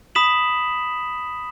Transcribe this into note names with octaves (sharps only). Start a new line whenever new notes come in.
B5 D#6 B6 E7 F#7